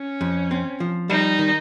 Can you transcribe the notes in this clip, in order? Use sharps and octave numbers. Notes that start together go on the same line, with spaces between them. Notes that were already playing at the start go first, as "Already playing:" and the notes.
Already playing: C#4
F2
C4
F3
G3 D#4
D#3